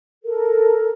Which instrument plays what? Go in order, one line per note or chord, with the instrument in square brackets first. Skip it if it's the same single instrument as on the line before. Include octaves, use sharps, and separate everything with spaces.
[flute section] A4 A#4